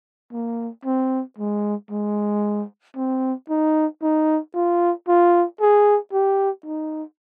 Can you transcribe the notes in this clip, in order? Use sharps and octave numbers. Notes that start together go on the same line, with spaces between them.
A#3
C4
G#3
G#3
C4
D#4
D#4
F4
F4
G#4
G4
D#4